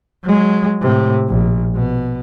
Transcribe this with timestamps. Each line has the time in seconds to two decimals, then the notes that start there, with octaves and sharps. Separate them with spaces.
0.24 F#3 G#3
0.82 A2 C3
1.29 A#1
1.75 B2